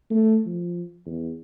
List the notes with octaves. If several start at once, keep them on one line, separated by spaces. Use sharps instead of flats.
A3
F3
E2